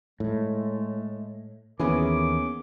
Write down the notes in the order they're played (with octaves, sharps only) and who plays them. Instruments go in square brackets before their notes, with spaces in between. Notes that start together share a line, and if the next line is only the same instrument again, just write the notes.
[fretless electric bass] A2 [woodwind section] G#3 A3
[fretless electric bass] D#2 E3 [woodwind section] D#3 A#4 D6 [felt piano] B3 C#4 G#4